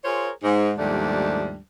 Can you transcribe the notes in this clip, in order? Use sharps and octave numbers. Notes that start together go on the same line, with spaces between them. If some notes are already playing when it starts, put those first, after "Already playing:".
F4 G#4 A#4 C5 C#5
G#2
D#2 G#2 F3 G3 A3 D4